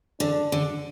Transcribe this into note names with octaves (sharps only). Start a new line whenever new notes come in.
D3 D4
D3